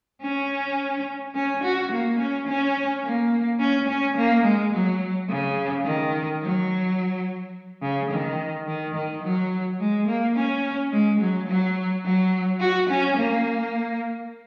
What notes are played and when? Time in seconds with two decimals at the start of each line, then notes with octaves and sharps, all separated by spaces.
0.22 C#4
1.35 C#4
1.63 F#4
1.91 A#3
2.19 C#4
2.47 C#4
3.04 A#3
3.59 C#4
3.88 C#4
4.17 A#3
4.44 G#3
4.72 F#3
5.29 C#3
5.85 D#3
6.42 F#3
7.82 C#3
8.11 D#3
8.67 D#3
8.95 D#3
9.23 F#3
9.80 G#3
10.07 A#3
10.36 C#4
10.92 G#3
11.21 F#3
11.47 F#3
12.04 F#3
12.60 F#4
12.89 C#4
13.17 A#3